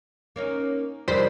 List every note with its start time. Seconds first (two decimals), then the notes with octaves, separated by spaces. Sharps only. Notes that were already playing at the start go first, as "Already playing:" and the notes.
0.36 A#3 C#4 D#4
1.08 F2 C3 D#3 G3 D4 D#4 C5 B6